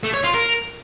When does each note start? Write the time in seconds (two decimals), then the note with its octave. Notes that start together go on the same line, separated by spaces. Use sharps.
0.03 A3
0.14 C#5
0.24 F4
0.34 A#4